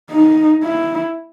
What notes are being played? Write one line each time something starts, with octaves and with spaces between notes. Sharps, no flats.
D#4
E4